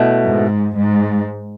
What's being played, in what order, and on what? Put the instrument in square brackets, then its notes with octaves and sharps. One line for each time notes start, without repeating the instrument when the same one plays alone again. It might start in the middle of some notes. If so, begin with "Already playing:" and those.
Already playing: [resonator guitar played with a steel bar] B2 A3 E4
[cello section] G#2
G#2